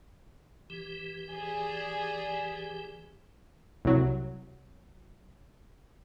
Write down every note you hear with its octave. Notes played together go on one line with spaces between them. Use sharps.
E3 G4
G#4 D5
C2 F#3